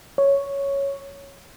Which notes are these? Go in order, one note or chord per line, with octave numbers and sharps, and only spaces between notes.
C#5